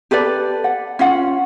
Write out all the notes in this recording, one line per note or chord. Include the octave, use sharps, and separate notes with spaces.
G4 A4 B4 D5
F#5
C#4 F4 F#5